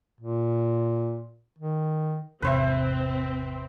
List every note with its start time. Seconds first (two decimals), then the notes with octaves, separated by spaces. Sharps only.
0.21 A#2
1.59 D#3
2.42 G#1 E2 C3 C4 B4 C5 E5